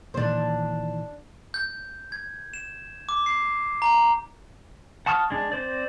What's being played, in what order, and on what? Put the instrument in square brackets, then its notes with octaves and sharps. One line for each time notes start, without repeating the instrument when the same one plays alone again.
[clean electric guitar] A#2 D#3 E3 [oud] D4 C5
[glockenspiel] G6
G#6
E7
D6
C7
A#5
[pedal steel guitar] F#5 A5 C#6 D#6 F6
G#3 D4
C4 C5 D5